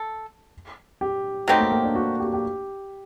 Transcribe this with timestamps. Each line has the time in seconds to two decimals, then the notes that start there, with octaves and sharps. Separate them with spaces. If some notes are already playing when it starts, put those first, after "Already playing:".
Already playing: A4
1.01 G4
1.48 F#3 A3 C4 D#4 G4
1.60 A#3
1.72 A#3
1.84 D4
1.95 F#4
2.20 G4
2.26 F#4
2.33 G4